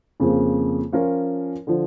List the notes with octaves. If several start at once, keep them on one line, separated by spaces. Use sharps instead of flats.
F2 C#3 F3 A#3
F3 C#4 F4 A#4 C#5
D3 F3